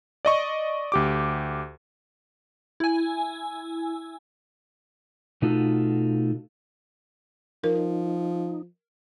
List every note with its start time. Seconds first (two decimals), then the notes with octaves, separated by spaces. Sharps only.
0.25 D5 D#5 C#6
0.92 D2 G4 D6
2.80 E4 G#5
5.42 B2 A3 D#4 F4 F#4 A4
7.64 F3 D#4 A#4